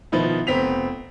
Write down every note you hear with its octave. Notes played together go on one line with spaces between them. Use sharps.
B2 D#3 F3 B3 D#4 E4
F1 B3 C4 B6 F7